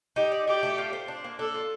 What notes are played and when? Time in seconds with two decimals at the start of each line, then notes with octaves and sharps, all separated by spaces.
0.16 D#4 G4
0.32 D5
0.48 G4 D5
0.63 A3
0.78 F4
0.93 C5
1.08 D4
1.24 A#3
1.39 D4 A4
1.54 F4